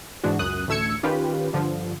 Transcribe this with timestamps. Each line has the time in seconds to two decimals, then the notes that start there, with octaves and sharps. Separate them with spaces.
0.24 G#2 E3 G#3 D4 F#4
0.39 C#2 F#2 D#6 F#6
0.68 A1 D2 A3 E6 G#6 C#7
1.03 D#3 C#4 F4 G4 B4
1.53 G2 D3 F3